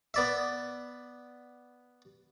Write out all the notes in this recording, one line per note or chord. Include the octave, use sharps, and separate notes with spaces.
B3 D5 E5